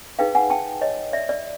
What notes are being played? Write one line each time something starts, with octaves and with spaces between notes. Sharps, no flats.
D#4 G#4 B4 F5 G5
F#5 G#5
G5 A5
C#5 D#5
D5 E5
D5